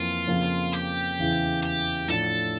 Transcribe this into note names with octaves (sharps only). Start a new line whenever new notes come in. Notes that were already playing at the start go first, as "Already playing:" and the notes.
Already playing: F2 E3 A#3 F4
F2 C#3 F3 A#3
G4
E2 C#3 E3
G4
A2 F3 A3 D4 A4